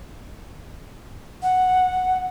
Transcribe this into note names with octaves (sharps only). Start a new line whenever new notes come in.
F#5